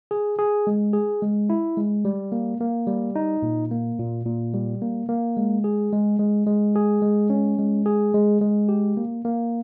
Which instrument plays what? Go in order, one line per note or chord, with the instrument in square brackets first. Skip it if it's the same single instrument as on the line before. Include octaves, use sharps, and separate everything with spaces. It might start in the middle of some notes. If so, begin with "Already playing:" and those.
[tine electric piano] G#4
G#4
G#3
G#4
G#3
E4
G#3
G3
A#3
A#3
G3
D#4
A#2
A#3
A#2
A#2
G3
A#3
A#3
G#3
G#4
G#3
G#3
G#3
G#4
G#3
C#4
G#3
G#4
G#3
G#3
G4
A#3
A#3